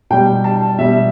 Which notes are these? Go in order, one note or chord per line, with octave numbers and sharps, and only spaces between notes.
B2 G3 G5
A5
B2 G3 E5